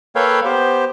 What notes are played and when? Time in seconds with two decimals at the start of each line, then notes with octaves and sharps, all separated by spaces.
0.15 A#3 A4 B4 C#5 F5 G5
0.45 B3 G4 C5